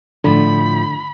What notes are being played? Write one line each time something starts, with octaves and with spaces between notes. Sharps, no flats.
A2 D3 F3 B5